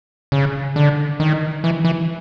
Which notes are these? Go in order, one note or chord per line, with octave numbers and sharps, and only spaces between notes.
C#3
D3
D#3
E3
E3